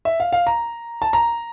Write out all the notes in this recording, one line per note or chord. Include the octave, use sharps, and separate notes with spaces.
E5
F5
F5
A#5
A5
A#5